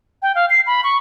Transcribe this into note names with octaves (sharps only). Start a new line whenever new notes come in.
G5
F5
C7
B5
C#6